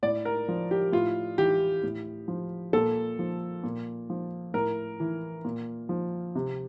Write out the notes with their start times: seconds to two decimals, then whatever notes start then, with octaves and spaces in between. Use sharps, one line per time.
0.03 A2 D5
0.25 A#4
0.48 F3
0.71 G4
0.92 A2 F4
1.38 E3 G4
1.83 A2
2.28 F3
2.73 A#2 A4
3.19 F3
3.64 A#2
4.10 F3
4.54 A2 A#4
5.00 E3
5.45 A#2
5.89 F3
6.35 C3